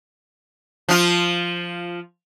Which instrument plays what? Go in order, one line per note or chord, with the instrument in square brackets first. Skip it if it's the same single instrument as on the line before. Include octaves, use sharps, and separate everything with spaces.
[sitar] F3 F4